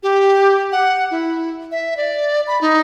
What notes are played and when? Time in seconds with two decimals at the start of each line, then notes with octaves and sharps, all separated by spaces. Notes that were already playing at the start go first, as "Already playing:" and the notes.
0.03 G4
0.72 F#5
1.11 E4
1.71 E5
1.97 D5
2.47 B5
2.61 D#4